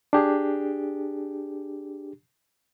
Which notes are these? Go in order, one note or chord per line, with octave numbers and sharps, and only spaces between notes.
D4 G4 G#4